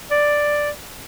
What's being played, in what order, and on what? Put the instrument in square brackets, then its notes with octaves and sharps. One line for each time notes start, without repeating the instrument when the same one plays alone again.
[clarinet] D5